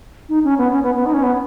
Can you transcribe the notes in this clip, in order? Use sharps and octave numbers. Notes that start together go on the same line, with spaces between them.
D#4
C#4
B3
C#4
B3
B3
D#4
C#4
B3